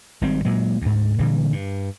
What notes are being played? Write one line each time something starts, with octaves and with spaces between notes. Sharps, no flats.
G#1 G#2 G3 C4
A#2 F#3 G#3
D2 G#2
A#2 D3 E3 G3
G2